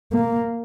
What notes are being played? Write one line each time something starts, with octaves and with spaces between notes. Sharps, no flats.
A#3